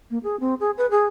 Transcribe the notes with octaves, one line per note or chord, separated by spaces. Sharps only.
A#3
G#4
C4
G#4
B4
G#4